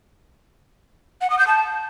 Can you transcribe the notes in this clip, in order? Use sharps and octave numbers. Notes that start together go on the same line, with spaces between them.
F#5
D#6
G6
A5